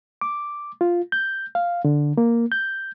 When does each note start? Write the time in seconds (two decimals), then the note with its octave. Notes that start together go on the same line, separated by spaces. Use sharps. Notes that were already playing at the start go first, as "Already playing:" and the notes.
0.21 D6
0.81 F4
1.12 G6
1.55 F5
1.85 D3
2.17 A#3
2.52 G6